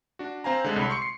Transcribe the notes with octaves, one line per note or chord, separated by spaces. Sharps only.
D4 F#4
C4 C5 F5 G#5 A#5
D3 G#3 A4
C2 C#5 B5
C6 C#6 C#7
C7